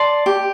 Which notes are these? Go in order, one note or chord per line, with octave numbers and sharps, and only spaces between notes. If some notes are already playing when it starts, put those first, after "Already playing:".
Already playing: D5 A5 C6
G4